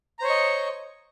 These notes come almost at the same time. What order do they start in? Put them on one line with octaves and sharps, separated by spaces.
A#5 C5 C#5 C#6 D#5